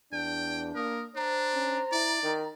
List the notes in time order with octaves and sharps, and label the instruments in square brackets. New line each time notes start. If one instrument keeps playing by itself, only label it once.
[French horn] E2 [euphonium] D4 [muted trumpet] G5
[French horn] A#3 [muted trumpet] A#4 [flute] D#6
[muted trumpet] D4 [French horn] C5 [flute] A#5
[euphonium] C#4
[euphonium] E4 [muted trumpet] D5
[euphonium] D#3